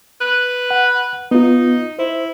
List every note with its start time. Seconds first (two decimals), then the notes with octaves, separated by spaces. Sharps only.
0.21 B4
0.71 F#5
1.31 B3 D#4 F4
1.99 E4 C5